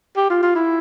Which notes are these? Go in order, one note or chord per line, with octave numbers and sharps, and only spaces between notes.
G4
F4
F4
E4